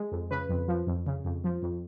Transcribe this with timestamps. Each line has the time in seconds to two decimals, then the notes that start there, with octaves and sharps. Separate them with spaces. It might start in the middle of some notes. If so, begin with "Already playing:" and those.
Already playing: G#3
0.11 F2
0.31 C#3 B4
0.49 F2
0.68 F3
0.87 F2
1.07 C#3
1.25 F2
1.44 F3
1.62 F2